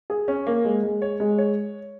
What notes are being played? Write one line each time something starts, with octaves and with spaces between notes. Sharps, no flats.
G#4
C#4
A#3
G#3
G#3
C#5
G#3
C#5